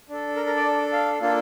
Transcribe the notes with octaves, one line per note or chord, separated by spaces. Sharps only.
D4 A4
A#4
A#4
D5
F5
A#3 D4 F4 A4